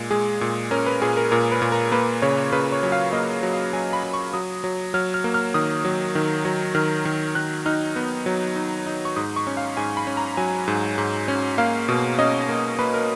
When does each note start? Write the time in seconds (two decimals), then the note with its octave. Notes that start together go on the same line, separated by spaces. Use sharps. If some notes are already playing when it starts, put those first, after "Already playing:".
Already playing: A#2 G#3
0.11 G#3 G#4
0.41 A#2
0.71 C#4 A#4
0.86 B4
1.02 A#2 G#4
1.17 A#4
1.31 A#2 A#4
1.52 B4
1.62 A#2
1.72 A#4
1.92 A#3 B4
2.22 C#3 C#5
2.52 C#3 B4
2.72 C#5
2.83 F#3
2.92 F5
3.13 A#3 D#5
3.43 F#3
3.53 F5
3.73 F#3 G#5
3.93 B5
4.03 F#3
4.13 C#6
4.33 F#3 D#6
4.64 F#3
4.94 F#3 F6
5.14 F6
5.24 A#3
5.34 F6
5.54 D#3 D#6
5.85 F#3
6.15 D#3
6.45 F#3
6.75 D#3 F6
7.05 D#3
7.35 D#3 F#6
7.66 D#4 F6
7.96 B3
8.26 F#3
8.56 D#4
8.86 D#4
9.05 C#6
9.16 G#2 D#6
9.36 C#6
9.47 C#4
9.57 F5
9.77 G#2 G#5
9.97 B5
10.07 C#4
10.17 A#5
10.37 F#3 G#5
10.68 G#2
10.98 G#2
11.28 C#4
11.58 A#3 F5
11.88 B2
12.19 C#4 D#5
12.49 A#3
12.79 A#3 B4
12.94 A#4